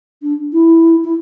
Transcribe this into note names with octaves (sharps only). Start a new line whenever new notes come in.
D4
E4
E4